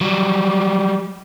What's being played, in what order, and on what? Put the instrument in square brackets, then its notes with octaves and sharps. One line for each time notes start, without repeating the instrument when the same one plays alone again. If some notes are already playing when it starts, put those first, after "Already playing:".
[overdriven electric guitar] F#3 G3